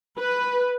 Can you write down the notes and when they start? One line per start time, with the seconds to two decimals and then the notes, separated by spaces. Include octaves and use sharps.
0.18 B4